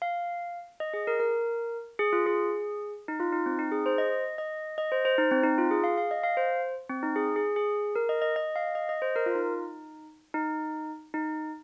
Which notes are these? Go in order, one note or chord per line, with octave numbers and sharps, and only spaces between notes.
F5
D#5
G#4
A#4
A#4
G#4
F4
G#4
D#4
F4
D#4
C4
D#4
G#4
C5
D#5
D#5
D#5
C5
C5
D#4
C4
D#4
F4
G#4
F5
F5
D#5
F5
C5
C4
D#4
G#4
G#4
G#4
A#4
D#5
D#5
D#5
F5
D#5
D#5
C5
A#4
F4
D#4
D#4
D#4